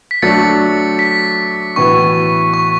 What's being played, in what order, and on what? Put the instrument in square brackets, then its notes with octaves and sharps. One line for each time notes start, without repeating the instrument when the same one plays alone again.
[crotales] B6
[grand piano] F#3 A3 D4 [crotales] A6 C#7
[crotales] B6
[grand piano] A2 E3 B3 F#4 [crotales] C#6
[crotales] C#6